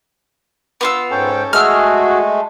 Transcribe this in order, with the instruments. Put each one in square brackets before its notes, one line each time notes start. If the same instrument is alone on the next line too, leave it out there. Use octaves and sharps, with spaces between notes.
[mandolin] B3 F4 E6
[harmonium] G#2 G5 [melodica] C#4 A4
[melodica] G#3 A3 [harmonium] F#4 G#4 [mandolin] E6 F6